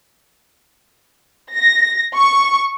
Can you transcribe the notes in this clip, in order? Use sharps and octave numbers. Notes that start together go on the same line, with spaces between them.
A#6
C#6